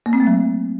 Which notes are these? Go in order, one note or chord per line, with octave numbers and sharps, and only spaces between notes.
A#3
C4
A3
F#3